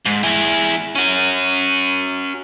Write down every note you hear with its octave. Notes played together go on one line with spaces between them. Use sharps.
G#2
E4 G#4
C#4 F#4